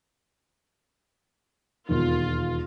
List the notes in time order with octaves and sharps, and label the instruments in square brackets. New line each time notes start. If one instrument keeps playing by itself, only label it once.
[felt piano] E1 D#2 [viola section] F4